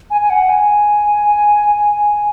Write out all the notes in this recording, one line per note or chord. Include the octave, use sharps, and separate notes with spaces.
G#5
G#5
F#5
G#5